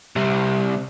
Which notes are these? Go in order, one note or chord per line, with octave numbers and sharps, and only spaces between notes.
C2 C3